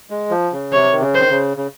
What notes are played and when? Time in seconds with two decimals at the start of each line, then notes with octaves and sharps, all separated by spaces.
0.10 G#3
0.31 F3
0.52 C#3
0.73 C3 C#5
0.93 D#3
1.01 C#3
1.15 D#3 C5
1.30 C#3
1.57 C#3